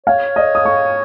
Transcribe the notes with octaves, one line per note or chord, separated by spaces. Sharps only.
C#5 F5
D#5
D#6
C#6